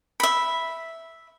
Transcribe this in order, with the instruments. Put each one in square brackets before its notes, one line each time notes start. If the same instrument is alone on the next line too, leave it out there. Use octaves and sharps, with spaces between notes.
[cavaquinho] E5 B5